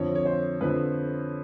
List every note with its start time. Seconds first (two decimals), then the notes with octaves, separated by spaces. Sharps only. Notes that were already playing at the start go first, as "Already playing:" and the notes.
Already playing: F2 D3 F3 C#5
0.15 C#5
0.25 C5
0.61 F2 D3 F3 B4